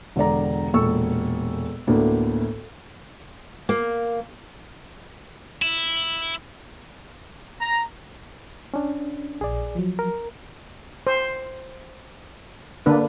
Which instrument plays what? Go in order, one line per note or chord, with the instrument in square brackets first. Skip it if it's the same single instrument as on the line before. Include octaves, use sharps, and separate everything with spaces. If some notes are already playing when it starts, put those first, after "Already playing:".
[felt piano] E1 D3 D5 A#5
E1 A#2 A4 C#6 E6
D2 A2 A#3 B3 D4
[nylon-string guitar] A#3
[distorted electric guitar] E4
[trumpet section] A#5
[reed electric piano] C#4 D4
[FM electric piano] A#1 [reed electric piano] G#4 D5
[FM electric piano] F3 F#3
[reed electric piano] A#4
[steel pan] C5
D3 A#3 D4 B4